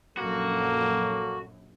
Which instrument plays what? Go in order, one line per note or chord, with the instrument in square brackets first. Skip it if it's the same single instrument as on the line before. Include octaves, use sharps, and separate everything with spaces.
[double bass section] A#1 F#2 [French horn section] F#3 A4 [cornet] A#3 [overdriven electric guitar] F#4